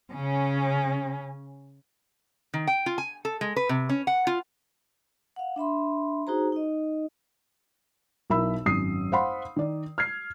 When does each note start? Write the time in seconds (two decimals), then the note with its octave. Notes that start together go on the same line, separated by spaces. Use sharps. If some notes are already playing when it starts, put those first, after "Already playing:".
0.13 C#3 C#4
2.54 D#3
2.67 G5
2.86 F4
2.98 G#5
3.25 A4
3.41 G#3
3.56 B4
3.69 C3
3.89 C#4
4.07 F#5
4.27 F4
5.36 F5 F#5
5.56 D4 E5 B5 C6
6.27 D#4 F#4 G#4 C5 A#5
6.52 D#4 D#5
8.30 B1 E4 A#4 E5 B5 E6
8.66 G#1 F#2 D#6 C7
9.12 C5 F5 F#5 B5 C6
9.56 D#3 D5
9.98 F6 G#6 C7